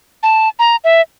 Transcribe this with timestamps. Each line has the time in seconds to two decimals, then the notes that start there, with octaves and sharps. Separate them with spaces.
0.23 A5
0.59 A#5
0.84 E5